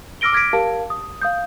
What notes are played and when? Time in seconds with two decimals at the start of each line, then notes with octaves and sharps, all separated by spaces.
0.21 D6 E6 F6 A#6 D7 G7
0.33 D6 F6 G#6 A#6 B6 D7
0.53 G4 A#4 F5 A5
0.90 D#6
1.22 F5 D#6 G6